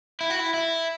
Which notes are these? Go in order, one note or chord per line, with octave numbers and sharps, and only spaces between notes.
E4
F#4
E4
E4